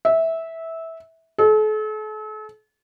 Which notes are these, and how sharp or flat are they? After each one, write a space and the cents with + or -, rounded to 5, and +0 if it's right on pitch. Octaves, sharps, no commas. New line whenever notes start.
E5 -15
A4 -40